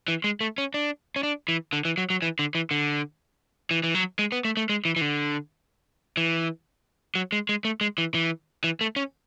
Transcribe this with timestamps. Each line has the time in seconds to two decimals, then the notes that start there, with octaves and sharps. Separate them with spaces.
0.08 E3
0.24 G#3
0.41 A3
0.58 C#4
0.74 D4
1.16 C#4
1.23 D4
1.48 E3
1.73 D3
1.85 E3
1.97 F#3
2.10 F#3
2.22 E3
2.39 D3
2.55 E3
2.71 D3
3.71 E3
3.83 E3
3.95 F#3
4.19 G#3
4.32 B3
4.45 A3
4.57 A3
4.69 G#3
4.85 E3
4.96 E3
5.01 D3
6.17 E3
7.15 F#3
7.32 G#3
7.49 G#3
7.65 A3
7.81 G#3
7.98 E3
8.15 E3
8.64 E3
8.81 A3
8.96 C#4